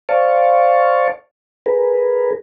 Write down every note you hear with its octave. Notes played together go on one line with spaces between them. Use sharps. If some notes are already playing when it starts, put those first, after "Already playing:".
C5 D5 F5 A5 C#6
G#4 A#4 B4